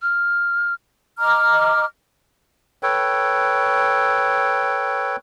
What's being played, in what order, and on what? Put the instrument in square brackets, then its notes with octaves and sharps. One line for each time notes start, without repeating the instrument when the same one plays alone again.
[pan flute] F6
[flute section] D#5 A#5 D6 F6
[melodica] A4 B4 C#5 G5